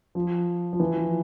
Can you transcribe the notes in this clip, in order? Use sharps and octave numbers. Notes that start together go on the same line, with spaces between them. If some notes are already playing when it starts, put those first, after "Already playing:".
F3
F3
E3
F3